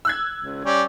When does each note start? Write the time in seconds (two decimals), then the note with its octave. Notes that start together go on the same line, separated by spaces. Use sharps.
0.05 E6 F#6 G#6
0.41 C#2
0.64 G3 C#4 D5